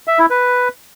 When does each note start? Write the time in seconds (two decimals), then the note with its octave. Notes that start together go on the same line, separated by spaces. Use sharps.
0.07 E5
0.19 E4
0.30 B4